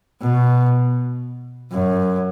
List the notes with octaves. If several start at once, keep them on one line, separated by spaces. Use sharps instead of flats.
B2
F#2